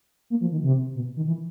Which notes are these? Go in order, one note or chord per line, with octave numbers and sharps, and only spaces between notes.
A#3
F3
D#3
C3
B2
D#3
E3